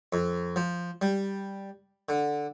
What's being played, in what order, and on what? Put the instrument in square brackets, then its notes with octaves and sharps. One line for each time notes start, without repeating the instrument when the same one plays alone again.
[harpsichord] F2
F3
G3
D3